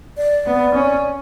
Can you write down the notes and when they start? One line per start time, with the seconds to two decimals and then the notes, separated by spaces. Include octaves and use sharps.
0.17 D5
0.46 B3
0.75 C#4